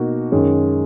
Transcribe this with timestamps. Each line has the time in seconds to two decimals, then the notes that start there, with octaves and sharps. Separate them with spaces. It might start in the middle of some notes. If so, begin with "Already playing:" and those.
Already playing: B2 A#3 D#4 F#4
0.32 F#2 D#3 G#3 C#4